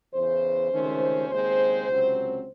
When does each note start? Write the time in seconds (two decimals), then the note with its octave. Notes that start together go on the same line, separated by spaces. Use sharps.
0.14 E2 C#3 E3 C5
0.72 C#2 C3 D#3 A3 C#4
1.29 D#2 C#3 G#3 C4 C5
1.88 C#2 C3 F#3 C4